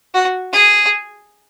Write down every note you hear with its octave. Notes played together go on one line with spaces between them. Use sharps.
F#4
G#4